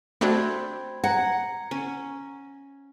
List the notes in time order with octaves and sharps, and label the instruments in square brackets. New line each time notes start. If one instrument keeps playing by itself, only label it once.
[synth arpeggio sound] A3 D4 F#4 [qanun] C4 [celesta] B5 G#6
[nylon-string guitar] F#5 [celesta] A#5 G#6 A#6
[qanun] C#4